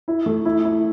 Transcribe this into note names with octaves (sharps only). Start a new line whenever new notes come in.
E4
A3
E4
E4